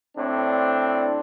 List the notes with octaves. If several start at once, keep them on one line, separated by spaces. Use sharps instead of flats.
A2 C4 D4